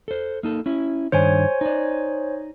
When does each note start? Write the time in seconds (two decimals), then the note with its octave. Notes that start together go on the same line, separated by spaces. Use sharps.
0.08 A4 C5
0.43 A#3 D#4 A4
0.66 C#4 E4
1.12 G2 D#3 D4 C5 C#5 G#5
1.61 D#4 D5